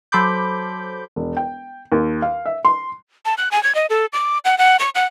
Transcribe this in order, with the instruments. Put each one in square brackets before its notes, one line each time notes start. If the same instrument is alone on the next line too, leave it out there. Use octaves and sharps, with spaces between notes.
[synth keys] F#3 A4 C5 B5 D6 G6
[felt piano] E1
G5
D#2
F5
E5
C6
[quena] A5
F#6
G#5
G#6
D#5
A4
D6
F#5
F#5
C#6
F#5